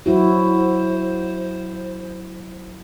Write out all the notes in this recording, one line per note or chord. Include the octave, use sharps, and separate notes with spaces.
F#3 E4 F#4 C5